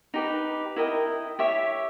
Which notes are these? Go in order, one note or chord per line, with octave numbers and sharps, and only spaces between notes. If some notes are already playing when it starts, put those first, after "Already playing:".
D#4 G4 B4
E4 A#4 D#5 G5
G4 C#5 E5